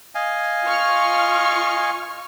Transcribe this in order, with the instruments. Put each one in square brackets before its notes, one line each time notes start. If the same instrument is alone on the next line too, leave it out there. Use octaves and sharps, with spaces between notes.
[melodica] D#5 F5 G#5
[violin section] F4 C#6 F6